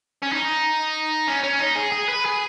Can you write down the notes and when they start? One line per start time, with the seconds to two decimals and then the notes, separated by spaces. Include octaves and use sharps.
0.22 C#4
0.32 D#4
1.27 C#4
1.43 C#4
1.60 D#4
1.76 G#4
1.92 G#4
2.09 B4
2.25 G#4